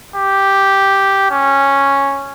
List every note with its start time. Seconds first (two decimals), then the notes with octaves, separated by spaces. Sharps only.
0.16 G4
1.31 C#4